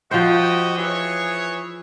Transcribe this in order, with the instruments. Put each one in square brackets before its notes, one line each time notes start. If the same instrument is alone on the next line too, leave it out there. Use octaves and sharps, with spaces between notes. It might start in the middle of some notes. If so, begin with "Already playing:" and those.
[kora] F3 C5 [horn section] F#4 G4 D#5
[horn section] E3 G#4 C#5